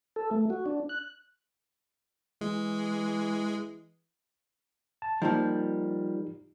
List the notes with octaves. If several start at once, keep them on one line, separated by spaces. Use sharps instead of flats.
A4
A3
F#4
D4
F#6
E3 G#3
A5
F3 G3 A#3 D#4